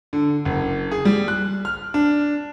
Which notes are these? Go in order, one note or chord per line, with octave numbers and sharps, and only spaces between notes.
D3
F#1
G#4
G3
F#6
F6
D4